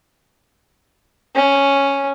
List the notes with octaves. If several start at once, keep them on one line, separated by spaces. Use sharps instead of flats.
C#4